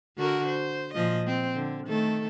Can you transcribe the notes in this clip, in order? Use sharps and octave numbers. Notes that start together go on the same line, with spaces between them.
D3 F#4 A#4
C5
A#2 F3 D#5
C4
D3
D#3 A3 A4